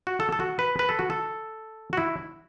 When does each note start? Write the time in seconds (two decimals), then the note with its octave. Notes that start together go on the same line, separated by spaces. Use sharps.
0.07 F#4
0.20 A4
0.32 A4
0.40 F#4
0.59 B4
0.79 B4
0.89 A4
0.99 F#4
1.10 A4
1.93 F#4
1.97 E4